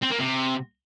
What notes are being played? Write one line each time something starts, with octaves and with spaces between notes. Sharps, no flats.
C4
A#3
C3